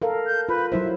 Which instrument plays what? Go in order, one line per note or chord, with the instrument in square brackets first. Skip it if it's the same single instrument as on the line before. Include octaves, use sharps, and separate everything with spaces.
[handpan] A4 A#4 F5
[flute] G6
[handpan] F4 [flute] B4
[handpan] F#3 E4 C5 [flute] E5